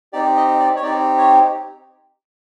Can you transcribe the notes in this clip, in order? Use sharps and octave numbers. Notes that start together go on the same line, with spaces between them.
C4 D#4 G4 D5
D#5
D5
C#5
C4 D#4 G4 D5
C#5